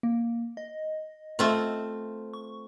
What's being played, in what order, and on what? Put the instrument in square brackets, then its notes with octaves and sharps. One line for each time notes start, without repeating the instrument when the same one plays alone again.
[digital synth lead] A#3
D#5
[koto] A3 C4 F4
[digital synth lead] C#6